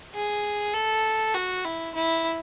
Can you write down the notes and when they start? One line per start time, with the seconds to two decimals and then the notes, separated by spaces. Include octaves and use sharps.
0.15 G#4
0.74 A4
1.34 F#4
1.65 E4
1.95 E4